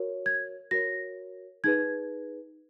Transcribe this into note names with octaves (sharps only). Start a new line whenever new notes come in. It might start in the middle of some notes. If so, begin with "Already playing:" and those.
Already playing: F#4 A#4 C#5
G#6
F#4 A#4 C#5 A#6
D#4 G#4 B4 G#6